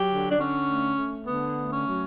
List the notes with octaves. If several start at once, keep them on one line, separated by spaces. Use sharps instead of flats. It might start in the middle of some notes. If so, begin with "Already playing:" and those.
Already playing: F#3 G4
D3
D4
D3 C#4
A3
A3
D3 B3
A3
C#4
F#3